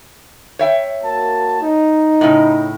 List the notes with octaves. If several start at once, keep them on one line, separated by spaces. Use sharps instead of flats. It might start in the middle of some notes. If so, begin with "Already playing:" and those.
C#5 E5 G5
A#3 F#4 A5
D#4
A2 C#3